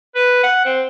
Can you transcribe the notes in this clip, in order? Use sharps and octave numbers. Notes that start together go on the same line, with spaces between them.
B4
F#5
C4